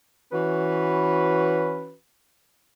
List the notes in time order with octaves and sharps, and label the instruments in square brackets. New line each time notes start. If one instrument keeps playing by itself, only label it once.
[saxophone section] E3 C#4 F#4 B4